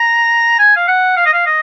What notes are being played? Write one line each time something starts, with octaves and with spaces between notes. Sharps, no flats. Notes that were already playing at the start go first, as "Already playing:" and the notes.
Already playing: A#5
G#5
F5
F#5
F5
D#5
F5
D#5